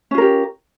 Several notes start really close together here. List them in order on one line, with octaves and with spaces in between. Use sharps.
C#4 F4 A#4 G4